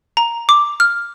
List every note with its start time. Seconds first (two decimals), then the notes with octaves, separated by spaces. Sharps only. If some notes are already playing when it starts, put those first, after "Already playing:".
0.17 A#5
0.49 D6
0.80 F6